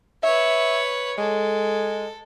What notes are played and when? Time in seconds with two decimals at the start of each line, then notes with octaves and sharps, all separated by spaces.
0.23 B4 C#5 E5
1.18 G#3 A4